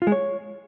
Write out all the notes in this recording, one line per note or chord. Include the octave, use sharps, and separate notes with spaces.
F4
G#3
C#5